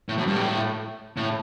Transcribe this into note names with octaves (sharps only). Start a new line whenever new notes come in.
A2
F#2
G2
A2
A2